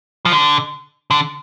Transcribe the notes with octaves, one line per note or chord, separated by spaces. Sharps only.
F3
D3
D3